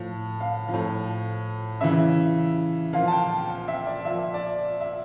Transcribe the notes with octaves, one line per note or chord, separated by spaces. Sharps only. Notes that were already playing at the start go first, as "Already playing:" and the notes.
Already playing: A2 F3
F5
F3
A2
C#3 E3 E5
A#2 F3 F5
A5
G5
G5
E5
D5
F3 E5
A#2
D5
E5